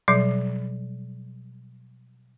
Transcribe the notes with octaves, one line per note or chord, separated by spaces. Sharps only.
B2 F#3 G3